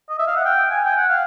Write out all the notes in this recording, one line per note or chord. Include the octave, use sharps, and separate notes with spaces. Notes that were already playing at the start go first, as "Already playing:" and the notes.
D#5
E5
F5
F#5
G5
G#5
G5
F#5
F5